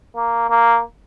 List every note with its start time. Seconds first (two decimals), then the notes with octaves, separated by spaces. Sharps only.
0.16 A#3
0.50 A#3